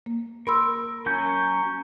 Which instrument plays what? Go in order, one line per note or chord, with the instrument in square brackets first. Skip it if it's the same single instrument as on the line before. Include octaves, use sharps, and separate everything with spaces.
[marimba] A#3
[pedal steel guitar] A#4 [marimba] B5 C6 E6
[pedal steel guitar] F#3 C#4 G6